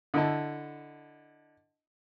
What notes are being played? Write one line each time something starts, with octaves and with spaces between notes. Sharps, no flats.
D3 E4 D#5 A5